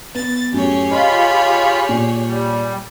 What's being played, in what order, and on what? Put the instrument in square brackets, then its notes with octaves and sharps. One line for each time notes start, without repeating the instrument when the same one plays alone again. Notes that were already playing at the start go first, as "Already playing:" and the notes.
[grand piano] B3 [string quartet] A6
[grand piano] F#2 A2 [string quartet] G4 G#4 C#5
[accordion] F4 B5 [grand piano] D#5
[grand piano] A#2
[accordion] G3